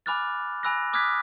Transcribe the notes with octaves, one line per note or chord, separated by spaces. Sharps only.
G#5 B5 D6 F6 F#6 A6
G#5 B5 E6 F#6 A#6
D6 D#6 F6 F#6 G#6 B6